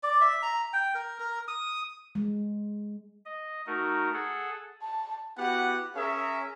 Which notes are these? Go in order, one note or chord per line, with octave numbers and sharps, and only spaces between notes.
D5
E5
A#5
G5
A#4
A#4
D#6
G#3
D#5
A3 D#4 F#4 A#4
G#4 A4 F#5
A5
B3 E4 F#4 G4 F#5
C#4 G#4 A#4 C#5 E5